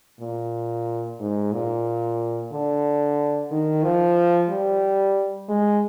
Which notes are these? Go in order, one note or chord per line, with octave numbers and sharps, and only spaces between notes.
A#2
G#2
A#2
D3
D#3
F3
G3
G#3